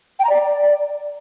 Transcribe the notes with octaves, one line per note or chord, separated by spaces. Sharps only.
G5
A#5
D5